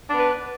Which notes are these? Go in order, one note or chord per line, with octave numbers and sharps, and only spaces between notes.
B3 D4 B4